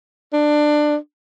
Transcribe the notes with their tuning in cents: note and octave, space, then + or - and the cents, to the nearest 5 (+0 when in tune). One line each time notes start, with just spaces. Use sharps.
D4 +20